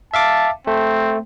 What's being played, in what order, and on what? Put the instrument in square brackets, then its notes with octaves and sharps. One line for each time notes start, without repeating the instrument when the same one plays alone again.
[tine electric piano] E5 F5 D6 [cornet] A5
[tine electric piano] A3 [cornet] C4